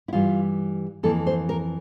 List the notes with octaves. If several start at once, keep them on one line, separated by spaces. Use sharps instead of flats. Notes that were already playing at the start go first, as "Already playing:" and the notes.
E4
G2 E3 G3 F4
F2 E3 A#3 A4
C5
A#4